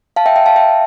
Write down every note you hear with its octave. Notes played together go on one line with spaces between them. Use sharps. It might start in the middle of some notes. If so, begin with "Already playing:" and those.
F5 A5
E5 G5
E5 G5
F5 A5
E5 G5